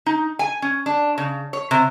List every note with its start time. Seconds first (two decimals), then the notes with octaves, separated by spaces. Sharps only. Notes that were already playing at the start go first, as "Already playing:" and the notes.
0.06 D#4
0.39 G#5
0.62 C#4
0.86 D4
1.18 C#3
1.53 C#5
1.71 C3